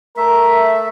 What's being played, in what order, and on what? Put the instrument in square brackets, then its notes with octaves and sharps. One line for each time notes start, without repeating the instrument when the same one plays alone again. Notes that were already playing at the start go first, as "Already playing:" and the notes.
[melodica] A3 E5 [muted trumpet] A#4